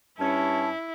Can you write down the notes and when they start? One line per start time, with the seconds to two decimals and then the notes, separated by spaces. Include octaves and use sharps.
0.19 G2 C#4 E4 A5